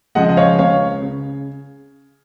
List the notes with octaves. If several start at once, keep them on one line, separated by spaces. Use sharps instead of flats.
C#3 F3 G#3 D#5 F#5
D#5
C#5 F5
C#2 C#5 F5
C#3